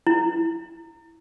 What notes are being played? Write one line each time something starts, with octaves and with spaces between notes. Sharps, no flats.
E4